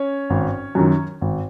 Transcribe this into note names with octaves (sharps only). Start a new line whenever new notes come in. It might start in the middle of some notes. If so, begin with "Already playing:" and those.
Already playing: C#4 C#5
G#1
F#2 D#3 F#3
G#1